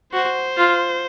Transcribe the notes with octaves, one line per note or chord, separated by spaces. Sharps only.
F#4 C5
F4